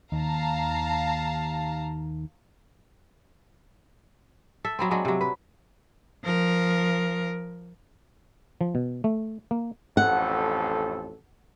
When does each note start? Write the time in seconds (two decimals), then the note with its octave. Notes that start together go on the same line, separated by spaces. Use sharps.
0.12 D#2 F5 A5 A#5
4.65 A4 E5
4.79 F#3 B3 C4
4.91 F#3 G#3 D4
5.05 C3 F#3
5.21 B4
6.24 F3 A#4
8.61 F3
8.75 B2
9.04 A3
9.51 A#3
9.97 A1 F2 A4 F#5